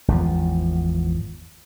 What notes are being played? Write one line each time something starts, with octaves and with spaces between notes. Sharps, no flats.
G#1 E2 F3